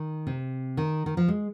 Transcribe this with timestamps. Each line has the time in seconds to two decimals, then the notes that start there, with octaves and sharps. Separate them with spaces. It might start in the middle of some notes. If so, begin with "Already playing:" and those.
Already playing: D#3
0.27 C3
0.77 D#3
1.06 D#3
1.17 F3
1.28 G#3